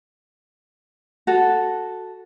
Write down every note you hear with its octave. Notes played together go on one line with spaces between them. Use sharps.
F#4 A4